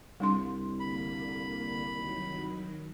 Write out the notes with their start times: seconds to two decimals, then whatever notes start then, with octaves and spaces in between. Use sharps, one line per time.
0.20 C2 G3 D4 C6
0.80 D3 A#3 B5
1.91 D#3 F#3